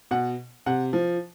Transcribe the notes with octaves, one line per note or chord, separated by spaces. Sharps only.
B2 F#5
C3 F#5
F3